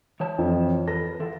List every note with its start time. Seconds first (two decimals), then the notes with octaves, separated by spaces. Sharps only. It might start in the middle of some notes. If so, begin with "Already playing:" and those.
0.20 E3 C#5 A5
0.38 F2
0.88 A4 B4 A#6
1.20 E3 A4